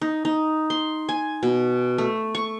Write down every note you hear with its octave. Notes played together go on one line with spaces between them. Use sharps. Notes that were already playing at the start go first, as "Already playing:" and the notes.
D#4
D#4
C6
G#5
B2
A3
C#6